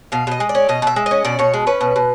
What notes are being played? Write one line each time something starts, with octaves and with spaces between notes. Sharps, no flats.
B2 F5
B2 D#5
G#3
D5
C#4
B2 D#5
B2 E5
G#3
C#4 D#5
B2 D5
B2 C#5
G#3
C#4 B4
B2
B2